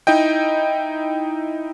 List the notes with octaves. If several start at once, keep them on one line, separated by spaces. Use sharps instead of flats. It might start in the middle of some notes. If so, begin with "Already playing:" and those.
D#4 E4 D#5 G5